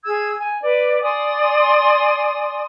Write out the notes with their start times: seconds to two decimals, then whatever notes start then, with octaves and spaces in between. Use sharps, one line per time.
0.05 G#4 E6 G#6
0.38 G#5
0.62 B4 D5
1.03 D5 G#5 C6 D#6